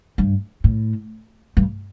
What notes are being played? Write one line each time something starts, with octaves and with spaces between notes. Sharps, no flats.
G2
A2
G2